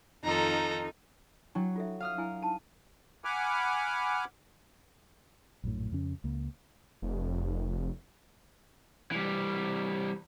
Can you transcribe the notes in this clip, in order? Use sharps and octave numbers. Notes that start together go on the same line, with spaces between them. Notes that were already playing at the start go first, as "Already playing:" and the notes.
F2 D#3 D#4 F4 A4 A#5
F#3 D4 E4 G5
F4 A4 E5
F5 D#6 F6
D4 E4 G#5
D#4 A5 D#7
F#5 G#5 B5 D6 F6
A#1 F#2 A2
F2 C#3 C#4
C#2 A#3
F1
E3 G3